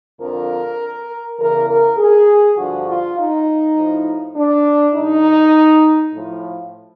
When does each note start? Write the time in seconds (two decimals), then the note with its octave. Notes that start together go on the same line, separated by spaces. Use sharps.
0.19 F2 D3 F3 A#4
1.38 E2 C#3 E3 A#4
1.68 A#4
1.97 G#4
2.57 G2 D3 F3 F#4
2.87 F4
3.16 D#4
3.76 A2 F3
4.35 D4
4.94 G2 D#3 D#4
6.13 A2 F3